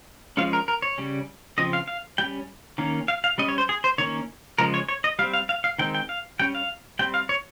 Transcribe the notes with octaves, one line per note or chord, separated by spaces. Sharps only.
F3 G#3 C#4 F5
A#4
A#4
C#5
C#3 G3 C#4
C#3 F3 C4 D#5
F5
F5
G3 C#4 G5
D#3 A#3 C#4
F5
F5
G3 C#4 D#5
C#5
C5
G#4
C5
D#3 A#3 C#4 C#5
C#3 F3 G#3 A#4
C#5
C#5
D#5
G3 C4 F5
F5
F5
F5
D#3 G#3 C4 G5
G5
F5
G3 C#4 G5
F5
G3 C4 G5
F5
C#5